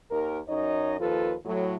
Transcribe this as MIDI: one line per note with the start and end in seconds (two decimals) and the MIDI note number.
0.11 0.39 39
0.11 0.39 51
0.11 0.39 70
0.48 0.95 42
0.48 0.95 63
0.48 0.95 73
0.48 0.95 75
1.00 1.35 39
1.00 1.35 53
1.00 1.35 65
1.00 1.35 69
1.00 1.35 71
1.45 1.74 45
1.45 1.74 54